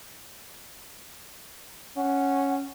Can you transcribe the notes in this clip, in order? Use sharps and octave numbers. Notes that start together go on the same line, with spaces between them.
C#4 F#5